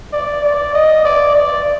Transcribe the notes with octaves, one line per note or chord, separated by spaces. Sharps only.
D5
D5
D#5
D5
D5